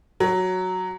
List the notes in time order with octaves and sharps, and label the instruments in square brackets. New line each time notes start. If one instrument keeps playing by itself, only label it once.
[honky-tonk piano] F#3